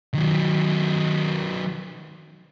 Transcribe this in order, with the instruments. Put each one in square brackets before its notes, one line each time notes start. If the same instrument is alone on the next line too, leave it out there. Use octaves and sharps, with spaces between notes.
[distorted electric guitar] D#3 F#3